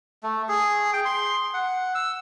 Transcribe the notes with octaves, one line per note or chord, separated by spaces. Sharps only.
A3
G#4
G5
C6
F#5
E6